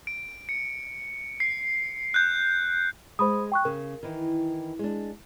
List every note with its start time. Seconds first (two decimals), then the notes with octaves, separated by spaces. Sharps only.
0.07 D7
0.49 C#7
1.40 C7
2.14 F#6 G6
3.19 G#3 C5 B5 D#6
3.52 G5 C#6 F#6
3.65 C#3 A#4
4.03 D#3 E3 E4
4.79 G#3 D4